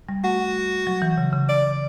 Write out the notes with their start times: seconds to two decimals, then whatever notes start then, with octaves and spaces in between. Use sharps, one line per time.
0.09 G3
0.24 A3 F#4
0.87 F#3
1.02 E3
1.18 C#3
1.33 C#3
1.49 D5